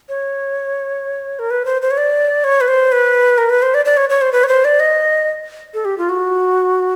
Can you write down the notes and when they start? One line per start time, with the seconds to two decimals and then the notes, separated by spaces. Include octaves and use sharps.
0.09 C#5
1.39 A#4
1.51 B4
1.65 C5
1.82 C5
1.91 C#5
1.98 D5
2.44 C#5
2.61 B4
2.68 C5
2.92 B4
3.38 A#4
3.50 B4
3.62 C5
3.74 D5
3.85 D5
3.97 C#5
4.10 C#5
4.21 C5
4.32 B4
4.44 C#5
4.48 C5
4.65 D5
4.80 D#5
5.74 A4
5.85 G4
5.98 F4
6.09 F#4